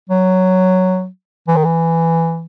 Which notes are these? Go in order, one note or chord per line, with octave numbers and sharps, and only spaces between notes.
F#3
E3
D#3
E3